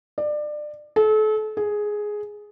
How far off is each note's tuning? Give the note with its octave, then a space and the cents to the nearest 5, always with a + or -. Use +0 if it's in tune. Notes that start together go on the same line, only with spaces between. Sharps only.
D5 +25
A4 -35
G#4 +5